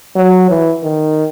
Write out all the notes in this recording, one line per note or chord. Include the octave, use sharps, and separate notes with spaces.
F#3
E3
D#3